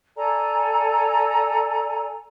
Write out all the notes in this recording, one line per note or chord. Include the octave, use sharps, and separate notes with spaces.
A4 D5 G#5 A#5